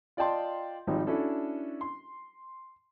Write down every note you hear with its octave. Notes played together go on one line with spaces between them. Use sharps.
F4 D5 D#5 G5 A5 C6
G#1 F3 G3 D#4
C#4 D4 E4 F#4 A4
C6